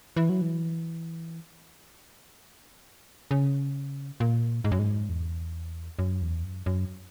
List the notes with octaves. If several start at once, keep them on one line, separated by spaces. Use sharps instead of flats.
E3
F#3
E3
C#3
A#2
G#2
F#2
G#2
E2
F#2
E2
F#2
F#2